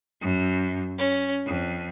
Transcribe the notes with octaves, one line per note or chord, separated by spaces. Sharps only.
F#2
C#4
F2